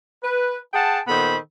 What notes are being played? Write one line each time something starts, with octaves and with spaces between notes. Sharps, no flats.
B4
G#4 F#5 G5 A5
A#2 D#3 B3 A4 C5 B5